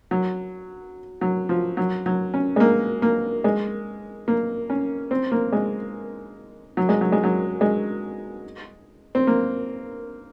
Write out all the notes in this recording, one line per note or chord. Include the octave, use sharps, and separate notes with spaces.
F#3
F#3
F3
F#3
F#3
C#4
G#3
A#3
A#3
G#3
A#3
C#4
C4
A#3
G#3
F#3
G#3
F#3
G#3
F#3
G#3
C4
A#3